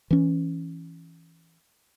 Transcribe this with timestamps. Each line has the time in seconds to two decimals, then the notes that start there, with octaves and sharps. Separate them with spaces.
0.11 E3 C#4